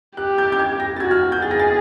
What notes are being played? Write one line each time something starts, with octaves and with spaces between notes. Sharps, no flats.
G4 F#6
G6
G6
G#6
A#6
A6
F#4 G#6
F6
F6
G6
G#4 A6
A#6
A6